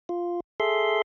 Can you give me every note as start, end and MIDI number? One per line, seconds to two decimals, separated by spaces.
0.09 0.40 65
0.60 1.02 68
0.60 1.02 69
0.60 1.02 76
0.60 1.02 84